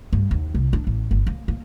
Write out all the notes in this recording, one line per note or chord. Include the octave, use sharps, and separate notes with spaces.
G2
D#2
C2
D4
A1
G1
A#3
A#3